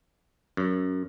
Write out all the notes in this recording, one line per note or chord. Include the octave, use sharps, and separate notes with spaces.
F#2